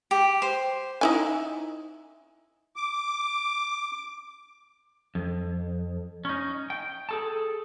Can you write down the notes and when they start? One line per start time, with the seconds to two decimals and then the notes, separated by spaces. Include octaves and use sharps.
0.11 G4
0.42 C5
1.01 D#4 E4 G#5
2.76 D6
5.15 F2
6.25 C#4 D#4
6.70 G5
7.09 G#4 A4 A5